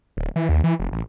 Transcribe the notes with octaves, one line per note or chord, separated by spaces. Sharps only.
D1
E3
D#2
E3
F1
A1